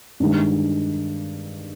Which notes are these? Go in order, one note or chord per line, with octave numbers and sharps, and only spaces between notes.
G2 D#3 G#3